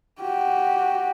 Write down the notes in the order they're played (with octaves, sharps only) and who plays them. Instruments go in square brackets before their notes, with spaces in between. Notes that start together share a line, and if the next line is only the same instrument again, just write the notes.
[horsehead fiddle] F#4 G4